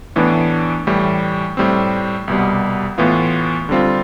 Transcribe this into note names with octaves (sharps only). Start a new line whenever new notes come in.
A2 E3 B3 D4
A2 E3 G3
A2 G3 C4
C2 B2 G3
A2 E3 B3 F4
D3 G3 C4 F4